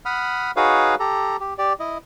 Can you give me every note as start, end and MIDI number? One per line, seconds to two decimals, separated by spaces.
0.05 0.51 78
0.05 0.51 83
0.05 0.51 87
0.05 0.51 89
0.56 0.95 63
0.56 0.95 66
0.56 0.95 68
0.56 0.95 71
0.56 0.95 73
0.56 0.95 77
1.00 1.37 67
1.00 1.37 69
1.00 1.37 82
1.40 1.54 67
1.58 1.73 67
1.58 1.73 74
1.80 1.98 64
1.80 1.98 75